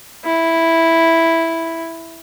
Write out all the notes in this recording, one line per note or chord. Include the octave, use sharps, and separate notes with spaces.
E4